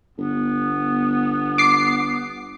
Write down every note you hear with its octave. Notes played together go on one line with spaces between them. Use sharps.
G1 B3
D6 C7